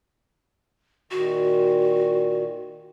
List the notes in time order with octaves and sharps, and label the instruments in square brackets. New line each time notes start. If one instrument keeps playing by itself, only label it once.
[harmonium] A#2 D#3 [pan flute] F#4